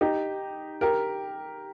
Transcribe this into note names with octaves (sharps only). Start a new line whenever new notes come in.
D#4 G4
G4 A#4